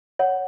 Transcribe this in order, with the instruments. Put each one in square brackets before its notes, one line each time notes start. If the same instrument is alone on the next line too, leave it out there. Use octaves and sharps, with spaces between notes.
[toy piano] C#5 F#5